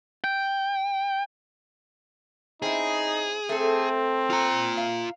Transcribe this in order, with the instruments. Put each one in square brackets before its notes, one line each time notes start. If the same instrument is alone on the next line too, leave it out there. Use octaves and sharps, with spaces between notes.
[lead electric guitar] G5
[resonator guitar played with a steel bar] C4 C#4 E4 [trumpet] D#4 [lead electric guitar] G#4
[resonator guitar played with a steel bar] A3 A4 [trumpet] C4
[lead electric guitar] F4 A#5
[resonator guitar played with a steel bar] F5